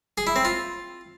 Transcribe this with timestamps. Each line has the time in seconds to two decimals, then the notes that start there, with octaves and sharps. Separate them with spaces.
0.18 G#4
0.27 E4
0.36 C4
0.45 F4